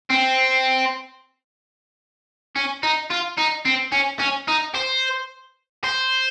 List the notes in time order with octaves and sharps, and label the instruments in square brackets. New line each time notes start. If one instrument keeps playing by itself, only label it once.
[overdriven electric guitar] C4
C#4
D#4
F4
D#4
C4
C#4
C#4
D#4
C5
C5